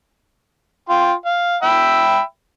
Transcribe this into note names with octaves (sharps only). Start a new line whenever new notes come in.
F4 G5 C6
F5
E5 G5 B5